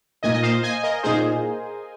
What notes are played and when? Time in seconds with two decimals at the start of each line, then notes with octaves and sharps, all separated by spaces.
0.23 A#2 A#3 D#4 D#5 G#5
0.34 D#5
0.43 C5 F5
0.63 D#5 G#5
0.83 A#4 D#5
1.03 A#2 A#3 D#4 G#4 C5